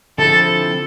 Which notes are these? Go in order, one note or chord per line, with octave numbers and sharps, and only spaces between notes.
D3 F3 C4 E4 A4